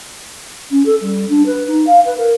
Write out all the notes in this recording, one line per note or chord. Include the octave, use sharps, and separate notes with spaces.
C#4
A4
G3
D4
B4
D#4
F5
B4
A#4